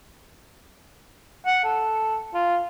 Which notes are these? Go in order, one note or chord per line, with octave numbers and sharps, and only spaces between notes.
F#5
A4
F4